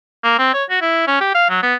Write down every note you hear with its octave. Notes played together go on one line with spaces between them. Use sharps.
A#3
C4
C#5
F#4
E4
C#4
G4
F5
F#3
B3